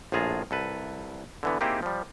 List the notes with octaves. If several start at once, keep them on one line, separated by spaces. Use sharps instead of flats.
A#1 A2 F4 G#4 A5 A#5
C2 A4 B4
D3 E3 B3
A#3 C4 D#4 E4 G4 G#4
F3 G3